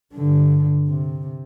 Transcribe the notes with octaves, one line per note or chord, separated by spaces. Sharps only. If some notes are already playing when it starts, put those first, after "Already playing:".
G2 D3
C3